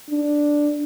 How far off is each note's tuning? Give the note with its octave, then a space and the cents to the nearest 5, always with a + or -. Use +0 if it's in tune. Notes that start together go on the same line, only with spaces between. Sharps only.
D4 +0